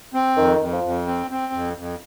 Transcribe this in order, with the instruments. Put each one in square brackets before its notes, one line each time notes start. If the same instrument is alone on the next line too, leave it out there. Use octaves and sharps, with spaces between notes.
[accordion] C4
[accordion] F2 [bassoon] D#3
[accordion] F2
[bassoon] F3
[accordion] F2
C4
C4
F2
F2